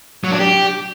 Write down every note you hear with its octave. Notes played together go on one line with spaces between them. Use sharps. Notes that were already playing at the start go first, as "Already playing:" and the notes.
F#3
D4
G4